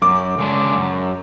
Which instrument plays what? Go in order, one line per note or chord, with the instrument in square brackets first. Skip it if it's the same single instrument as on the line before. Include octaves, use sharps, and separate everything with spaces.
[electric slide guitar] F#2 [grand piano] D6
[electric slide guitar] C#3 G#3 D4
F#2